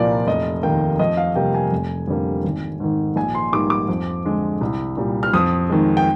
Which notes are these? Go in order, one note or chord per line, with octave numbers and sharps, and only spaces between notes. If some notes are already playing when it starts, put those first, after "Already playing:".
Already playing: C2 A#2 F3 A#3 D5
F1 D#5
D#2 D#3 A#3 G5
F2 D#5
F5
C3 G3 A#3 G5
G#5
F1
F2 D3 G3 A#3
G#1
G#2 D#3
A#1 G#5
C6
G#2 G3 A#3 D6
D6
F2
D3 G#3
C2
A#2 G3
F6
F2 D#6
D#3 G#3
G5